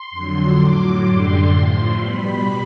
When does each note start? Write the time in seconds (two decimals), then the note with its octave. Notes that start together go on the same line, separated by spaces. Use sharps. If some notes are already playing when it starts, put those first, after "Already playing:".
Already playing: C6
0.11 F2 D3 F#3
0.57 A2 F#3 D6
1.02 F#2 D3 G3 C6
1.48 A2 F3
1.94 B2 G3 B5